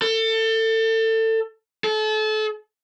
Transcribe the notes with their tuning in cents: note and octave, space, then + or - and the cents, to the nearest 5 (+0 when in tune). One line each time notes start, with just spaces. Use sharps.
A4 +25
A4 -30